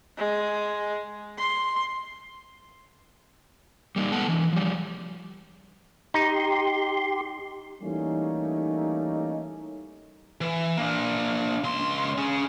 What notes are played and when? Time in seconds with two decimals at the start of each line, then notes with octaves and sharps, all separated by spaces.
0.17 G#3
1.38 C6
3.96 G3 A#3 D#4
4.12 G#3 B3 A4 F#5
4.28 E3 D4
4.53 F3 G3
6.14 D#4 G4 C6
7.81 E3 G3 A3 A#3 C#4 D#4
10.41 E3
10.77 A#3 D4
11.64 C#2 C6
12.18 C#4 G#4